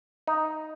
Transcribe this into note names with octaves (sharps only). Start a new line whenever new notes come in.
D#4